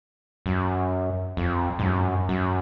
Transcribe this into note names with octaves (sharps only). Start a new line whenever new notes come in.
F#2
F2
G#2
F#2
F#2